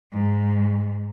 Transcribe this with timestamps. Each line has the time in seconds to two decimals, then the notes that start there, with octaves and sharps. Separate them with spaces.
0.13 G#2